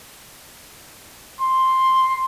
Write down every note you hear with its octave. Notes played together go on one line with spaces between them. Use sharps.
C6